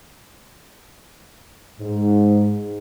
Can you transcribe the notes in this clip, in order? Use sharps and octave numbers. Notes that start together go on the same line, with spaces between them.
G#2